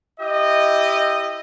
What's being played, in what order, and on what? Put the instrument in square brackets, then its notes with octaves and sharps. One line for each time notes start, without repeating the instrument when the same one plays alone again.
[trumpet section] E4 G4 D#5